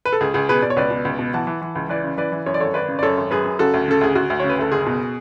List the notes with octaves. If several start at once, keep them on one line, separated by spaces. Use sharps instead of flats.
B4
A4
C#2 G#4
C#2 G#4
B2 G#4 B4
B2 D5
C#5
C#2 B4 D5
B2
C#2
B2
E3 F#5 A5
E3
E3
C#2
E3 B4 D5
C#3
E3 B4 D5
E3
F#2 C#5
D5
G#1 A4 C#5
G#1 B4 D5
C#3
D5
F#2 A4 C#5
G#1
F#2 G#4 B4
F#2
C#3 F#4 A4
D2
C#3 A4
D2 G#4
D2 F#4
D2
C#3 C#5
B4
D2 A4
F#1 G#4
B2